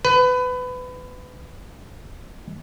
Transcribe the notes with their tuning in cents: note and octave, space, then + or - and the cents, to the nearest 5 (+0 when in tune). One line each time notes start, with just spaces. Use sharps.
B4 +25